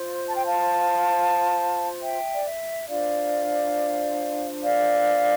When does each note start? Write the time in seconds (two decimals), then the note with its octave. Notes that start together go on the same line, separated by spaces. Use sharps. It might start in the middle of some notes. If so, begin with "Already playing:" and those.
Already playing: F4 C5
0.27 A5
0.35 G5
0.45 F5 A5
2.01 E5 G5
2.34 D5
2.45 E5
2.88 D4 F4 C5 D5 F5
4.63 D5 F5